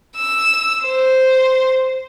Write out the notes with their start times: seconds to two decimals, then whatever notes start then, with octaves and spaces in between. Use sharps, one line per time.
0.17 E6
0.84 C5